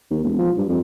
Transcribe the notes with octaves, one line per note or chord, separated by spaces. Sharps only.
D#2
E1
F3
G2
F2